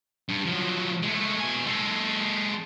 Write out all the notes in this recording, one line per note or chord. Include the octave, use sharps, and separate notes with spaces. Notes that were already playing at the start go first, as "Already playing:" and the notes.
G2
F3 F#3
G#3 A3
B2 G#5
G#3 A4